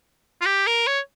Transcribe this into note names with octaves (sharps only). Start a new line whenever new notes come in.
F4
G4
A#4
C#5